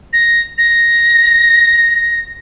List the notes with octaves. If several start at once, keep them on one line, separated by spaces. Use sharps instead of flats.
A#6
A#6